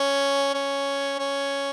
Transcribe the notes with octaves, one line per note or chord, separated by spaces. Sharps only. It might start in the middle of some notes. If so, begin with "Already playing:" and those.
Already playing: C#4
C#4
C#4